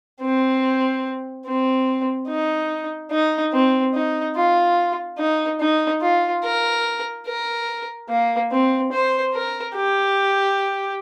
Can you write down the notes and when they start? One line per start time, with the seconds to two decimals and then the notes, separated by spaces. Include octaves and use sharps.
0.21 C4
1.46 C4
2.28 D#4
3.11 D#4
3.53 C4
3.94 D#4
4.36 F4
5.18 D#4
5.60 D#4
6.01 F4
6.43 A#4
7.26 A#4
8.09 A#3
8.51 C4
8.92 C5
9.34 A#4
9.75 G4